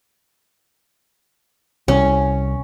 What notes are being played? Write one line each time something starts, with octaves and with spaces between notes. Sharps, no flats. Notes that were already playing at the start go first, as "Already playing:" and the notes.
C2 C#4